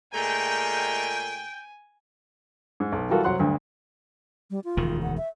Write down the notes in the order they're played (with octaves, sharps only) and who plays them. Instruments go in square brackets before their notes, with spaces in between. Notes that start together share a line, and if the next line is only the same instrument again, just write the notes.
[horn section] A#2 G#3 A3 [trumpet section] G5 [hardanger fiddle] G#5 [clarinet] A#5
[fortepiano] G#2
B1
E3 G3 F4 F#4 A4 A#4
C2 F#3 F#5 C6 F#6
D2 G2
[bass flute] G3
F4
[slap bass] E1 D2 D#3
[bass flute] F#5
E5